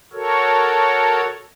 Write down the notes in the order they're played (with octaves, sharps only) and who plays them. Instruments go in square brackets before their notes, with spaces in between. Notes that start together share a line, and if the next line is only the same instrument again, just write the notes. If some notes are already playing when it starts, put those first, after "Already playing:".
[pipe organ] F#4 A4 A#4 C#5